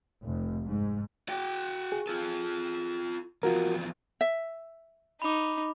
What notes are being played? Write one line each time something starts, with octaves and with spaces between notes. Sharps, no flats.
F1
G#2
F#4 G5
G#4
F4 A4
E2 F3 F4 F#4 A#4
E5
D#4 B5 D6